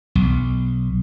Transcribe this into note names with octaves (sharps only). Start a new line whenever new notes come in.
B1